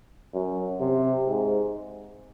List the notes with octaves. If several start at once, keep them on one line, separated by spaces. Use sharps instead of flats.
F#2
C3
G#2